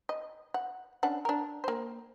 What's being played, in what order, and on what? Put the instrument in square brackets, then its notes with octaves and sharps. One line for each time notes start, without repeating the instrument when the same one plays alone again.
[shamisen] D#5
F#5
C#4 D4 F#5
D4 A#4
A#3 C5